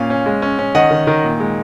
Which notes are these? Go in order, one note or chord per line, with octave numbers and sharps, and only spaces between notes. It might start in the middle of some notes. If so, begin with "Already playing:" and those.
Already playing: A#2 C#4 F5
C#4
G#3
C#4
C#4
D#3 D#5 F#5
D#3
D#3
A#2
G#3